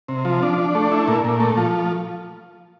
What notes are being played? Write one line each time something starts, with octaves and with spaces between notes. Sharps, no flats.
C3
F3
D4
D4
A3
E4
A#2
A#2
A3
F3